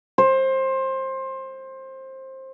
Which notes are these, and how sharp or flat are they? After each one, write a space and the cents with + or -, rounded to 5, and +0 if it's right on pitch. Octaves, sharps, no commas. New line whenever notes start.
C5 +20